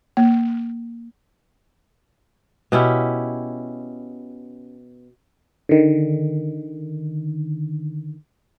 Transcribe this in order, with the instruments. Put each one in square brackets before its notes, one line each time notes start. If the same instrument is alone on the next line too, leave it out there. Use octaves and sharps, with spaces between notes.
[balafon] A#3
[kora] B2 C#4 E4 G4
[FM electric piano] D3 D#3